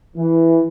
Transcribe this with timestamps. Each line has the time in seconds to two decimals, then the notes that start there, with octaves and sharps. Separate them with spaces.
0.16 E3